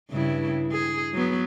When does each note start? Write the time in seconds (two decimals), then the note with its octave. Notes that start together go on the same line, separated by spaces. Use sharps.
0.11 G2 C#3 E4
0.72 G#4
1.14 F#3 B3